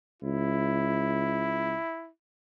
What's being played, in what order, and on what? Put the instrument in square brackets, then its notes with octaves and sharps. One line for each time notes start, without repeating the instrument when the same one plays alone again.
[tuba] C#2 [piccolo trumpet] E4